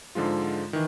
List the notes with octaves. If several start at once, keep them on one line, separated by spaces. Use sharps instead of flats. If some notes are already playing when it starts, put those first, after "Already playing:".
G#2 D3 F3 G#3 F4
D#3 E3